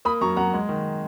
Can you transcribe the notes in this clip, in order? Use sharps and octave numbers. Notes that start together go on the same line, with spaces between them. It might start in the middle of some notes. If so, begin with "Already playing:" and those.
A#3 B5 D#6
F#2 A#5 C#6
F#2 F#5 A#5
G#3
D#3